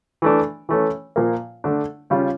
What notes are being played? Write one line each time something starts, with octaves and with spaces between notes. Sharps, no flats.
E3 A3 D4
E3 A3 C#4
A#2 F3 A#3
D3 A3 D4
C#3 G3 C#4 F4